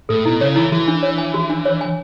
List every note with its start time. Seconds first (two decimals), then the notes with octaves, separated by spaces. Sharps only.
0.09 A2 A4
0.26 B2 E4
0.41 C#3 C#5
0.56 E3 E4
0.72 E3 F#4
0.88 D4
1.03 C#5
1.18 G#5
1.34 F#4
1.50 D4
1.65 C#5
1.81 G#5